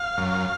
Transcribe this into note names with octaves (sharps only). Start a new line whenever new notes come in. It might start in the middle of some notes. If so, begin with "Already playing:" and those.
Already playing: F5
F#2